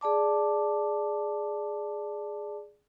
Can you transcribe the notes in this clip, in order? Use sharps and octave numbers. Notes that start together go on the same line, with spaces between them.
G#4 D5 A5 D6